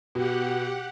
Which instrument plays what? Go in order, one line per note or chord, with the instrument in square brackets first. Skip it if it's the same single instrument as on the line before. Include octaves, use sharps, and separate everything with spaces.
[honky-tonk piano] B2 [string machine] G4 F#5